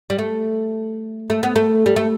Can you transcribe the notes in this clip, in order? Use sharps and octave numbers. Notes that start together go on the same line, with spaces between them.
G3
A3
A3
B3
A3
G3
A3